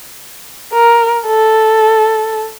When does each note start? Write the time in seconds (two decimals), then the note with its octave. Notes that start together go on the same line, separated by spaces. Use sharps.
0.73 A#4
1.27 A4